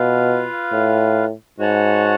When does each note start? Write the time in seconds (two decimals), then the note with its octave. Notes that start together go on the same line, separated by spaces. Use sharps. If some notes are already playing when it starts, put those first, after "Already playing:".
Already playing: B2 F4 B4 F5
0.73 A2
1.59 G#2 F#4 C#5 F#5 A5